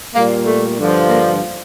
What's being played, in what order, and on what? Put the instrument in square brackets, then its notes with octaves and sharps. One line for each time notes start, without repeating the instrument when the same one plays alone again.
[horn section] A#2 G3 A#3
A3
G2 D3 F3
A#3